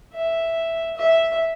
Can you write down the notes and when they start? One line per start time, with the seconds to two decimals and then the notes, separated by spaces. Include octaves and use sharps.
0.13 E5
0.97 E5